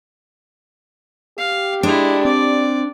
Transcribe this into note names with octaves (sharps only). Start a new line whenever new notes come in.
G4 F5
G#3 D4 E4
C4 D5